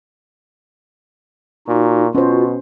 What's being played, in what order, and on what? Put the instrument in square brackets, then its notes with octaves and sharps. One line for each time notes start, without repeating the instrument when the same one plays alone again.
[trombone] A#2 [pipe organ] D#4 F#4
[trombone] B2 [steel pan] C#4 C5 [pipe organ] F4 F#4